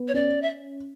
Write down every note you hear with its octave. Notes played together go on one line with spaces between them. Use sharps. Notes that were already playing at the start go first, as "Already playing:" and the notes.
Already playing: B3
C#5
C#4 D5
E5